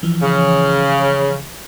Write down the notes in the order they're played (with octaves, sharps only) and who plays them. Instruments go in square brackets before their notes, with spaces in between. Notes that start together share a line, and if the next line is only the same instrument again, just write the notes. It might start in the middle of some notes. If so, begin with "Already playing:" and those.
[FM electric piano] E3 F3
[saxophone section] C#3